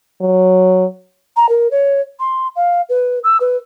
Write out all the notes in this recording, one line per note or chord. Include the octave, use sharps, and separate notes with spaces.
F#3
A#5
A#4
C#5
C6
F5
B4
E6
B4